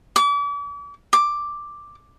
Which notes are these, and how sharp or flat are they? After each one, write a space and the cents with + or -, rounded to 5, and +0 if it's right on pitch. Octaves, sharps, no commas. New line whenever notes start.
D6 -40
D6 +5